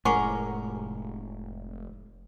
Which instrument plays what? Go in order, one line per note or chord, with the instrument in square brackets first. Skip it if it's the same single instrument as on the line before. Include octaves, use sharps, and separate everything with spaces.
[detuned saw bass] F1 [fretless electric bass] A2 G#3 [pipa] C#4 A#4 [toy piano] F#5 C#6 D6